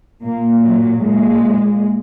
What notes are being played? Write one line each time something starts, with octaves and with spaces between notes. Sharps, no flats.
A#2 A#3
F#3
A#2 G#3